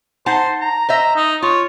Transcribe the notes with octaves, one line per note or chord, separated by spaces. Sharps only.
D#4 C5 F#5 A5
A#5
C5 D#5 E5 A#5
D#4
F4 C#5